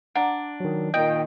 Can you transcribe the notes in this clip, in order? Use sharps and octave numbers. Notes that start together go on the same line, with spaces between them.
D4 F#5 A#5
D#3 F#3
A#2 D#3 D#5 G5